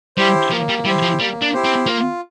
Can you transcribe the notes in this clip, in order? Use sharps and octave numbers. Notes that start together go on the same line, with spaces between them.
G3 E4 G4 C5
F3 A#3
G3
G3 E4 G4 C5
F3
G3 A#3
D4
E4 G4 C5
C4
A#3 F4